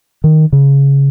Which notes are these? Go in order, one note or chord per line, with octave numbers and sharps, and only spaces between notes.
D#3
C#3